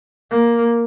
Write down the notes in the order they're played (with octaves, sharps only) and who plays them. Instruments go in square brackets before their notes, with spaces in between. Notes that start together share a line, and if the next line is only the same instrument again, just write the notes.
[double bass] A#3